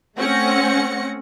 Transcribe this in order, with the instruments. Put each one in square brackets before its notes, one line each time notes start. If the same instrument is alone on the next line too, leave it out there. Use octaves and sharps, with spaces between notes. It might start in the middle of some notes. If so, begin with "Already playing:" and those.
[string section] A3 C4 C#4 F#5 A#6 C#7